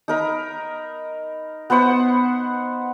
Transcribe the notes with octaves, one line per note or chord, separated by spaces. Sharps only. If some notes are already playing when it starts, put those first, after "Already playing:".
D#4 A#4 B5
B3 B4 C5 F#5